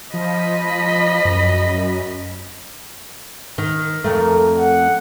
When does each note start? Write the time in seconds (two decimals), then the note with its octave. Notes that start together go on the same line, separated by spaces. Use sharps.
0.14 F3 D#5 B5
1.25 F#2
3.58 D#3
4.04 F2 A3 A#4
4.59 F#5